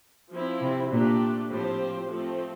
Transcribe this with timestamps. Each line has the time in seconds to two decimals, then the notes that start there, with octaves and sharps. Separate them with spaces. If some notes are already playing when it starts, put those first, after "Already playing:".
0.31 F3 C4 E4
0.61 C3
0.91 A#2 A3 D4 G4
1.50 A2 F3 C4 G4 C5
2.09 F3 A3 C4